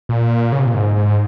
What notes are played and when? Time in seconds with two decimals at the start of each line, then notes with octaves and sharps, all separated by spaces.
0.09 A#2
0.52 C#3
0.60 C3
0.67 A#2
0.74 G#2
0.96 G#2